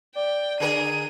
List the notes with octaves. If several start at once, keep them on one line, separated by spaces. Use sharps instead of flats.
D5 G5
D3 G#4 A#4 D#7